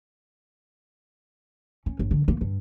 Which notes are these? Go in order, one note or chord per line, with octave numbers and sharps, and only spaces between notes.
C#4
G1
D3
A#3
G2